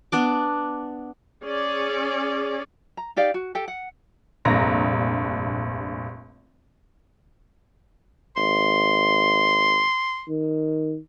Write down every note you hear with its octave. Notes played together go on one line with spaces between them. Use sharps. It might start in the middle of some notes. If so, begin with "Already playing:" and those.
B3 D4 D6
C#4 G#4 D5
A#5
D#4 G4 D5 F5
F#4
G4 A4 G5
F#5
F1 A#1 G2 A#5 A#6
G#1 C6
D#3